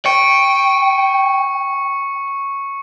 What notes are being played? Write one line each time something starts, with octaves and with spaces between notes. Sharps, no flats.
G5 C#6 C#7